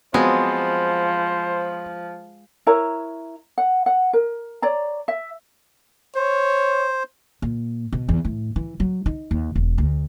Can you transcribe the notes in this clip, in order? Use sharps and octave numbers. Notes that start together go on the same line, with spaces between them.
F3 F#3 G#3 B3 C4 C5
E4 A#4 C#5 A#5
F#5
F#5
A#4
C#5 D5 A#5
E5
C5 C#5
A#2
B2
E2
A2
E3
F#3
D#4
D#2
E1
D2